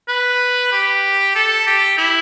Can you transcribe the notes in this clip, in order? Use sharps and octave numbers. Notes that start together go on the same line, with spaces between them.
B4
G4
A4
G4
E4